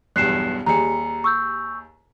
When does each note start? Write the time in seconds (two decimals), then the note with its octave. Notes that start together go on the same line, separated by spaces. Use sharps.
0.16 B1 E2 G2 F#6 C7 E7
0.66 D#2 G3 G#4 A#5 C#7
1.24 C#6 E6 G6